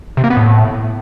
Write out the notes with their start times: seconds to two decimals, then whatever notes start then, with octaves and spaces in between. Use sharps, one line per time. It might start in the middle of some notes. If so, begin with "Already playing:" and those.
0.17 C3
0.24 A#3
0.30 B3
0.37 A2